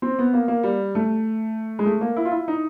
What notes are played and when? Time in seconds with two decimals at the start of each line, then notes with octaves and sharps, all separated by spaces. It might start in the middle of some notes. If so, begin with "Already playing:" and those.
0.02 C4
0.19 B3
0.34 A#3
0.48 A#3
0.63 G3
0.95 A3
1.79 G#3
1.86 A3
2.01 A#3
2.16 E4
2.25 F4
2.32 E4
2.48 D#4